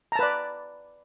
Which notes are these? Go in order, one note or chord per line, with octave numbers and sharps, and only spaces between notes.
B4 D5 A5 A#5